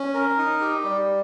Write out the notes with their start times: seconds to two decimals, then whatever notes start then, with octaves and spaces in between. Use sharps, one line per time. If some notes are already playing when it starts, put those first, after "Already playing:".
Already playing: C#4
0.14 A#4
0.38 D#4
0.61 G4
0.84 G3